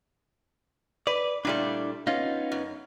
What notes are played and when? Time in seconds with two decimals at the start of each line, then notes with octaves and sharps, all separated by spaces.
1.07 B4 D5
1.45 A#2 G3 A3 D4 E4 D5
2.07 B3 C#4 D#4 F4
2.52 F#2